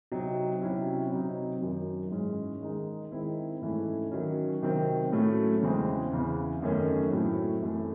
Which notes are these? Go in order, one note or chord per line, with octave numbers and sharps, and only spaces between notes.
C3 F#3 C4 D#4
C3 F#3 C#4 E4
C3 F#3 C4 D#4
F#2 D#3 F#3
G#2 E3 G#3 C#4
D#3 G#3 D#4
D#3 G#3 C4 E4
G#2 E3 A3 C#4 E4
D#3 F#3 C#4
C3 D#3 F#3 C4
A2 F#3 A3 C#4
E2 C#3 E3 G#3 C4
E2 C#3 E3
F#2 D#3 A3 C#4
A2 F#3 A3 C4 E4
F#2 E3 A3